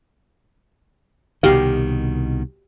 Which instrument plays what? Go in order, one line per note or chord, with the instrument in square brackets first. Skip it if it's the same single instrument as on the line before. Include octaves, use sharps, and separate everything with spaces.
[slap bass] C2 B2 D#3 [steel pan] F#4 G4 F5